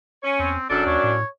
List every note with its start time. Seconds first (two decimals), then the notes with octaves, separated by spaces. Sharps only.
0.23 C#4 C#5
0.39 E2 C4
0.70 E1 F#2 D4 A4
0.86 D#2 C#5
1.03 A2